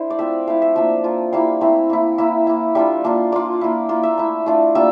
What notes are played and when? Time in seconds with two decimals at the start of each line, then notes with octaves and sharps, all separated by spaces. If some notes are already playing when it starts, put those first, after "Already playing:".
Already playing: D4 E4 C5
0.10 D5
0.18 A3 C4 F4 E5
0.47 A3 E4 F5
0.62 E5
0.76 F3 A#3 D4 E5
1.04 F3 A#3 F4
1.33 G3 A#3 E4 F5
1.61 A3 C4 E4
1.90 A#3 E4
2.18 A#3 E4 E5
2.47 A#3 E4
2.75 G3 D4 F4 E5
3.04 A#3 D4 F4
3.32 A#3 F4 D5
3.61 A#3 E4
3.89 A#3 F4
4.03 E5
4.18 A3 E4
4.46 A3 D4 F4
4.75 G3 A#3 D4 F4 E5